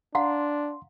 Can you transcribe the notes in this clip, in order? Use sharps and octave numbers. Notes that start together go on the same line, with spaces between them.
D4 F5 F#5 A#5 C6